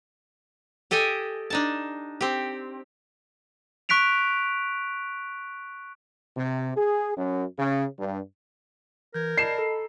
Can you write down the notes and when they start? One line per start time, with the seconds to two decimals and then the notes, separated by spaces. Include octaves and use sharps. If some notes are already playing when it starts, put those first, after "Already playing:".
0.91 G4 A4 D#5 G5 G#5
1.50 D4 D#4 A5
2.21 C4 G4
3.89 C#6 F#6 B6 D7 F7
6.37 C3
6.77 G#4
7.17 F#2
7.59 C#3
7.99 G2
9.14 E3 A#4 G6 G#6
9.37 D5 D#5 A5 B5 C7 E7
9.58 A4 A#5